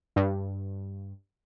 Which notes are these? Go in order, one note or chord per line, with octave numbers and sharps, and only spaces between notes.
G2